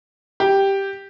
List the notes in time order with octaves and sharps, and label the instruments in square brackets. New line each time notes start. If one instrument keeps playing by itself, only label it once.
[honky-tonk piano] G4